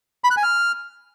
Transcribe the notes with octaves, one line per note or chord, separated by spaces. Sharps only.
B5
F#6
G#5
F6